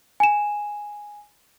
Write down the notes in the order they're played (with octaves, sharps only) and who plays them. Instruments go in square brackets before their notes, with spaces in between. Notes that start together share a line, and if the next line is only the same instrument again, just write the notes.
[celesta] G#5 E7